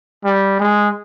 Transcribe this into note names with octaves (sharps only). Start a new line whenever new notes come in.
G3
G#3